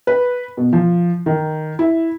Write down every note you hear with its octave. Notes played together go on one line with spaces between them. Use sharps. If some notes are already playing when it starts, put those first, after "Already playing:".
B4
B2
F3
D#3
E4